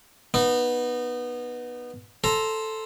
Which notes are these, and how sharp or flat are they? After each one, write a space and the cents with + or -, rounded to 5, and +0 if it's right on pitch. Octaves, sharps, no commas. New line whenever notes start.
B3 -15 D#4 -25
A4 +0 C5 +0 A#5 +0